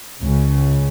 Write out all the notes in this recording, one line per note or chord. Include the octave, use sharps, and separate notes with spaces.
C#2 C#3